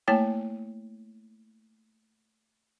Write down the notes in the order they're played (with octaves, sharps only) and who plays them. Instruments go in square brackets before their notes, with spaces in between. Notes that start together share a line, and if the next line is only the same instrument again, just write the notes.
[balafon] A3 A#3 E4 C#5 G5 A5